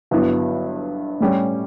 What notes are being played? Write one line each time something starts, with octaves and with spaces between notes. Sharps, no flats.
G1 G2 F#3 B3 E4
A2 G3 C#4 G4